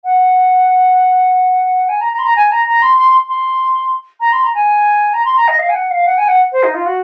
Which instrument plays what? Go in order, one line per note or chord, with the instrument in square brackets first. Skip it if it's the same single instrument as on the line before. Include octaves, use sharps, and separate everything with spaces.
[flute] F#5
G#5
A#5
A#5
C6
A#5
G#5
A#5
A#5
C6
C6
C6
A#5
C6
A#5
G#5
A#5
C6
A#5
D#5
F5
G#5
F#5
F5
F#5
G#5
F#5
C5
D#4
F4
F#4